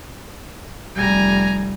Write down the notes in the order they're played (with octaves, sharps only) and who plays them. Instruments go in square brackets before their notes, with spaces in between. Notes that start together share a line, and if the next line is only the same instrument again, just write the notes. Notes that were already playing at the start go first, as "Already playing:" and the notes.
[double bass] F1 G3 [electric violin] G#5 A#5